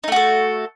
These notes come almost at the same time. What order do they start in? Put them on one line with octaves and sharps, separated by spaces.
D#4 A3 F#4 A4